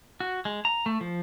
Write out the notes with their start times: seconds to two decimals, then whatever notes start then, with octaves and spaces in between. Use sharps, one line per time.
0.20 F#4
0.45 G#3
0.65 A#5
0.86 A3
1.01 F3